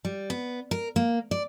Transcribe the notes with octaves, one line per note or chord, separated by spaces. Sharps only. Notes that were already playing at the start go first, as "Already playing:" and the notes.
G3
B3
A#4
A#3
D5